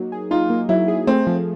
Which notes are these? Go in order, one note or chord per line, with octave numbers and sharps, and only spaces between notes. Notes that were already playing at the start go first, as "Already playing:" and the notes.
Already playing: F#3 A#3 D#4
G#4
D#4 F4
A#3
F#3 E4
G#4
A3 C4
F3